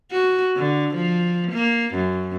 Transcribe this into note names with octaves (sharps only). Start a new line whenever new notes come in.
F#4
D3
F3
A#3
F#2